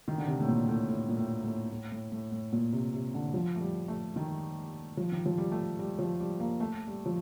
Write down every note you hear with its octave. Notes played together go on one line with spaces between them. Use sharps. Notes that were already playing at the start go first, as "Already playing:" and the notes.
D#3
D3
C3
A2
A#2
A2
A2
A#2
A2
A2
A2
A2
A2
A2
A#2
C3
C3
D3
F3
A3
G3
A3
D#3
F3
D#3
F3
G3
A3
G3
F3
G3
A#3
A3
G3
F3